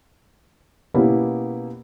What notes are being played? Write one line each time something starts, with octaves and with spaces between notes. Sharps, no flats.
B2 A#3 B3 C#4 E4 G4